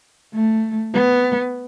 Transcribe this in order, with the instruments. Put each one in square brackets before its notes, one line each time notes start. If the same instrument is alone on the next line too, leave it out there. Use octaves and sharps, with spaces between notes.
[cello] A3
B3